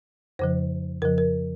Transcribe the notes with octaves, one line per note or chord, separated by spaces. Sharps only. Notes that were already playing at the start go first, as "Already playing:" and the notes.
F2 C#3 F3 C5
F2 C#3 F3 A#4
A#4